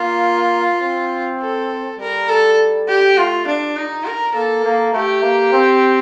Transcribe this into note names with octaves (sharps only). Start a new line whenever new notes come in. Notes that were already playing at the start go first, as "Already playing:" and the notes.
Already playing: A#3 F4
C4
A4
G3 A#4
A4
G4
A3 F4
D4
D#4
A#4
A#3 A4
A#3
A3 G4
A#3
C4